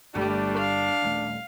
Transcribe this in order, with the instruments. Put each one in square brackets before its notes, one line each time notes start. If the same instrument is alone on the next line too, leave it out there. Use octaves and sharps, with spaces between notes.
[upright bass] G1 G2 [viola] G3 A3 [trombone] D4
[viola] F5
[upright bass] D#1 A3